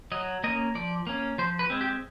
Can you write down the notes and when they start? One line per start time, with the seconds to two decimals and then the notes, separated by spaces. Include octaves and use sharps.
0.12 F#3 D#5
0.44 A#3 C#4 D#5
0.75 F3 D5
1.07 A#3 C#4
1.38 F3 C5
1.59 B4
1.70 G#3 C4
1.81 G4